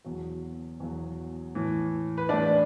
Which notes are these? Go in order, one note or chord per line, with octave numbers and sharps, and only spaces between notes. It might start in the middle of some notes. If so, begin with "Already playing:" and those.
E2 B2 F#3
E2 B2 F#3
A2 E3
B4
A2 E3 D4 D5